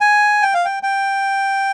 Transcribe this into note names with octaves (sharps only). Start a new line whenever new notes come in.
G#5
G5
F5
G5
G5